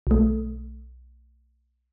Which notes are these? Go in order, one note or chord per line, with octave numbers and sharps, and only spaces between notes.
B1 A3